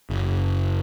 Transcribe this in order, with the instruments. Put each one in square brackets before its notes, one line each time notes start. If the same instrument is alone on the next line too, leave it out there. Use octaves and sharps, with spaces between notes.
[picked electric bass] F#1